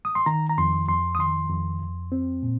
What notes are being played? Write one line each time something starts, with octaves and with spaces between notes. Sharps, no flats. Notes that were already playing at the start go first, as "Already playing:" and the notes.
D#6
C6
D#3 A#5
A#5
F2 C6
F2 C6
D#6
D#3 C6
F2
F2
C4
A#2